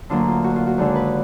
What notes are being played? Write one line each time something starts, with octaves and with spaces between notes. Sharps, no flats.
D2 D3 F#3 A#3 D4 F4
F4
F#4
F4
F#4
D#2 D3 G#3 D4 G#4
B4